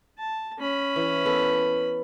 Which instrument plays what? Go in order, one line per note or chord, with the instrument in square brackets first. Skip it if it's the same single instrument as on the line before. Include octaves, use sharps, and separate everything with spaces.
[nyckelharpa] A5
C#4 B5
[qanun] E3
B3 A4 A#4